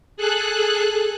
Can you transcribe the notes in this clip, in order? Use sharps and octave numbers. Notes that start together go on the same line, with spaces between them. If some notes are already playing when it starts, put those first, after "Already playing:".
G#4 A4 F#6